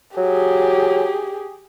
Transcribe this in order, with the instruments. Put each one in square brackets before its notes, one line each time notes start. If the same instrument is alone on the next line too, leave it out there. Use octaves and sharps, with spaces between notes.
[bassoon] F#3 [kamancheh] G4 G#4